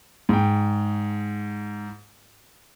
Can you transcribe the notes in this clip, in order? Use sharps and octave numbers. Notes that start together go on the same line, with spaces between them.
G#2 G5